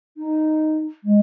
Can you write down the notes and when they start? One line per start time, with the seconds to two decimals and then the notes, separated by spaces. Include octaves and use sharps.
0.17 D#4
1.03 G#3